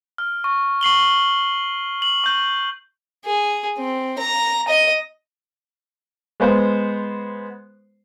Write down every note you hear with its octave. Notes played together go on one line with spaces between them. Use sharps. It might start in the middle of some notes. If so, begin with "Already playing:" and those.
F6
C#6
C#6 C7 F#7 G7
F#7
C#6 G6
G#4
C4
A#5
D#5
G#3 B3 C5